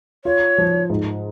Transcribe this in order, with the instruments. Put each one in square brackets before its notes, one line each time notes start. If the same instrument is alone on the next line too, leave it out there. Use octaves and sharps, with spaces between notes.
[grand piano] F4 [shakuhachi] C#5
[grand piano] F3
G#2